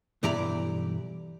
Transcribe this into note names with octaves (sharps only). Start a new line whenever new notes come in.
B1 G2 E3 G4 D5 A#5